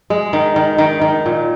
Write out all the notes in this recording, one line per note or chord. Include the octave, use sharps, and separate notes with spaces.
G#3
D#3
D#3
D#3
D#3
A#2